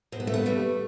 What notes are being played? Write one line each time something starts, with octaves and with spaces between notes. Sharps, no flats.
B2 C4
B3
A3
B3
G3 A3